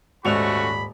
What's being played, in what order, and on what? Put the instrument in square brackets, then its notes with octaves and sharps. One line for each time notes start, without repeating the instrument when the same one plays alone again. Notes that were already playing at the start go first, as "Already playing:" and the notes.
[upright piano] D#1 D5 F7 [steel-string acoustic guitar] G#2 [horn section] A3 C#4 F#4 [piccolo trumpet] B5